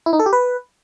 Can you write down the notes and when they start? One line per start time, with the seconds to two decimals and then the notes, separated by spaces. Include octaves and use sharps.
0.06 E4
0.13 D#4
0.19 A4
0.26 G4
0.33 B4